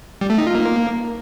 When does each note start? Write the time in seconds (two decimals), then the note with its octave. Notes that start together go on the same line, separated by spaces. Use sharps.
0.21 G3
0.30 A3
0.38 D#4
0.47 F4
0.55 A#3